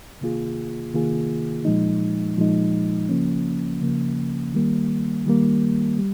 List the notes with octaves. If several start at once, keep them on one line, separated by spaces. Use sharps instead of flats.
C3 D#3 A#3 F4 G#4
C3 D#3 A#3 F4 G#4
A#2 F3 G#3 D#4
A#2 F3 G#3 D#4
C#3 F3 A#3 C#4
C#3 F3 A#3 C#4
D#3 G3 A#3
D#3 G3 A#3
G3